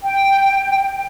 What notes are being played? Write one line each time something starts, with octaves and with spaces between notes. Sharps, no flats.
G5